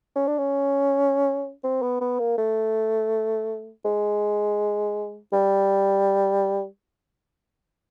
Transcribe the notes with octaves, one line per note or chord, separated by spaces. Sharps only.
C#4
D4
C#4
C4
B3
B3
A#3
A3
G#3
G3